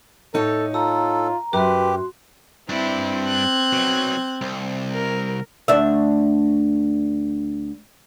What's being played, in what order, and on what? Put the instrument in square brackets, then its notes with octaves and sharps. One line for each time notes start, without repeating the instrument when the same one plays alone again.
[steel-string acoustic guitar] A2 D#4 C#5 [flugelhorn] A4
[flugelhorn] F4 [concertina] A4 [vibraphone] A#5
[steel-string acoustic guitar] F#2 [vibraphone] F#4 C6 [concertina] G4 [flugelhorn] B4
[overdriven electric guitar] G2 D4 [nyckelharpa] C4 [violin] E4
[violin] F#6 G#6
[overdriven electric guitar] B2 F#3
C2
[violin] A#4
[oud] D2 D4 E5